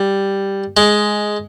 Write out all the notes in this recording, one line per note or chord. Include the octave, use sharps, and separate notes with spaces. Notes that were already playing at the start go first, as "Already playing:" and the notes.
Already playing: G3
G#3